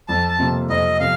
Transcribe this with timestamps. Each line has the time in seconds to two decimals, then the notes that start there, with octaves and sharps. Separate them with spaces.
0.08 F2 A5
0.29 A5
0.39 C3 F3 A#3 F4
0.69 F2 D#5
1.00 C3 F3 F5